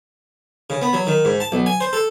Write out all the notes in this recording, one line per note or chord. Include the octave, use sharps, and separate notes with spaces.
C#3
B3
F#3
D#3
G#2
A5
B1
G#5
C5
A4